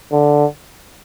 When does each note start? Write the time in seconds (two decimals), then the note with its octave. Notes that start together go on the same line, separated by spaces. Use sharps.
0.12 D3